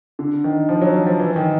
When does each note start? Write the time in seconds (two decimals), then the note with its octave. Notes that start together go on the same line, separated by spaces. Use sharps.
0.19 D3
0.44 D#3
0.69 F3
0.81 F#3
0.94 F3
1.07 F3
1.19 E3
1.36 D#3